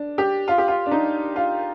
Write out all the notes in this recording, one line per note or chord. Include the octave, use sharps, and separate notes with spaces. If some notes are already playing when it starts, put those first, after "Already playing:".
Already playing: D4
G4
F4
G4
F4
D4
D#4
F4